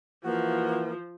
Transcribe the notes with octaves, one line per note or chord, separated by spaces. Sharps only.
E3 F3 A#3 F#4